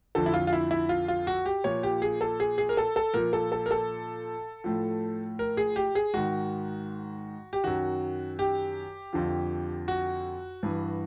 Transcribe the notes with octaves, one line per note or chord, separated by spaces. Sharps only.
F2 D3 F3 A4
E4
F4
F4
E4
E4
F4
F4
F#4
G4
A#2 F3 C#5
G4
G#4
A4
G#4
G#4
A#4
A4
A4
A#2 F3 A#4
A4
A4
A#4
A4
A2 F3
A#4
G#4
G4
G#4
G#2 D#3 F#4
G4
F#2 D#3 F#4
G4
F2 D3 F3
F#4
G2 E3